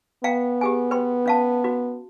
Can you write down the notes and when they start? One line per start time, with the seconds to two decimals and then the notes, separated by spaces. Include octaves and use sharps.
0.24 B3 F5 G5 A#5
0.61 G4 G#4 G#5
0.91 B4 G5 C6
1.26 C#4 F5 A5
1.64 F#4